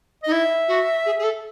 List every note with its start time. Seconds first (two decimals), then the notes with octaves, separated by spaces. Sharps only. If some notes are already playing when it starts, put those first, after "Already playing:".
0.23 D#4 D#5
0.32 E4 E5
0.68 F#4
1.06 G#4
1.19 G#4
1.23 A4